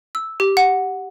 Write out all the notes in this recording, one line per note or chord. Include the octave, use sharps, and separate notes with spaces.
E6
G4
F#5